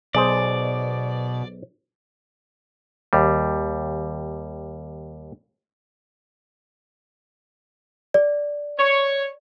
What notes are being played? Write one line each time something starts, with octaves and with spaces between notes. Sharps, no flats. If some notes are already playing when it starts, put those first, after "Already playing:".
B1 B2 G#4 C5 D5
D#2 G3
D5
C#5